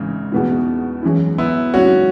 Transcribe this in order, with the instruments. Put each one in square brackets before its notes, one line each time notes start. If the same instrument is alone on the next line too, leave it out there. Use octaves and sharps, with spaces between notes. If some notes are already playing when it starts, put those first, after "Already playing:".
Already playing: [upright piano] G#1 G#2 E3 [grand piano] C#3
[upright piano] E2 B2 B3 E4
F#2 E3 G#3 C#4 E4
[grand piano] B3 E4
[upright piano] G#1 F#2 C#3 [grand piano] C#4 F#4